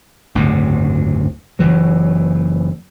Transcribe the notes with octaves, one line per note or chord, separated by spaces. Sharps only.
F#1 D2 G#2 C3
F#1 E3 F#3